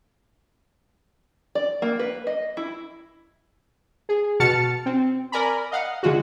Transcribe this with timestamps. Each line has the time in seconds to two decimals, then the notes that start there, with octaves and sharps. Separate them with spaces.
1.55 D5
1.82 A#3
1.99 B4
2.27 D#5
2.57 E4
4.09 G#4
4.40 B2 F#4 A5 F6 A6 C#7
4.86 C4
5.32 A#4 D5 G#5 A#5 B5
5.72 D#5 F5 F#5
6.03 D3 G#3 F4 F#4